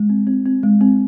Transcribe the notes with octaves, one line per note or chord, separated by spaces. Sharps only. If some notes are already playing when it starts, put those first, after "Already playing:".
Already playing: G#3
C4
C4
C4
G#3
C4